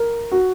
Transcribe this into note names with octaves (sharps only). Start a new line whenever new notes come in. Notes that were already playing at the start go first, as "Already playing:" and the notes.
Already playing: A#4
F#4